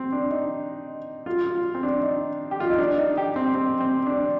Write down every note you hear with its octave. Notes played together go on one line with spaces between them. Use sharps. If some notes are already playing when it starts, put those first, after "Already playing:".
Already playing: C4
D4
D#4
F4
F4
C4
D4
D#4
G4
F4
D#4
D4
D#4
G4
C4
C4
C4
D4